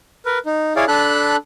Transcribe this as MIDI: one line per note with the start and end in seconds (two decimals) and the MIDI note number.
0.26 0.39 70
0.26 0.39 71
0.46 0.73 63
0.76 0.85 64
0.76 0.85 68
0.76 0.85 73
0.76 0.85 74
0.76 0.85 77
0.88 1.36 62
0.88 1.36 69
0.88 1.36 83
0.88 1.36 90